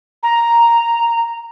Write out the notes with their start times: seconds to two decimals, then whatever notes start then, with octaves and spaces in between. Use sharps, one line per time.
0.23 A#5